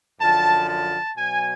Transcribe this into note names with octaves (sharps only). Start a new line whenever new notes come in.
F#2 D3 F3 A5
A5
B2 F#3 G#5